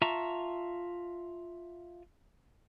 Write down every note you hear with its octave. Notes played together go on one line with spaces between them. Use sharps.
F4 E5 A5 A#5 C#6